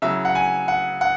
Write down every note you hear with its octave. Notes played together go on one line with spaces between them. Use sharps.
C#3 F#3 E4 E5
F#5
G#5
F#5
F#5